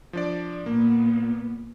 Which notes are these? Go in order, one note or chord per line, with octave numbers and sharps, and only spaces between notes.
F3 D4 D5
A#2 A#3 B3